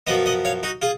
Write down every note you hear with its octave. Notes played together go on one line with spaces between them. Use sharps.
F#2 F3 B3 D#5 F#5
D#5 F#5
C#5 F5
D#4 F#4
F4 G#4